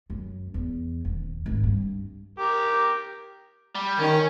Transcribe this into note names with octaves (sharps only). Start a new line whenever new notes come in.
F#2
E2
D#1
G#1
G2
G4 A#4
G3
D#3 C#4